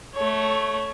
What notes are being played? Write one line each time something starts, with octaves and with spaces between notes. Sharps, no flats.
A3 C#5